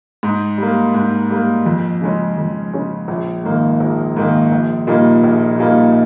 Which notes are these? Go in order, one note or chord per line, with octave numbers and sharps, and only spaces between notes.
G#2
G3 A#3
G#2
G3 A#3
F2
C#3 G#3 C#4
F2
C#3 G#3 C#4
A#1
G#2 D#3 A#3
A#1
G#2 D#3 A#3
A#1
A#2 G3 A#3 D#4
A#1
A#2 G3 A#3 D#4